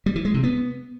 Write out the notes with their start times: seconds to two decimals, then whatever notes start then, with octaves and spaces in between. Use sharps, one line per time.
0.06 G3
0.16 E3
0.25 G#3
0.34 C3
0.43 B3